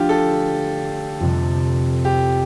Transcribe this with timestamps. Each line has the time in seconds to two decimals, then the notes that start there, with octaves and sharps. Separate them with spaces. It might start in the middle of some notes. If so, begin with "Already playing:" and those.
Already playing: D3 F3 A3 D4 F4 G4
0.09 A4
1.20 F2 C3 G3
2.05 G4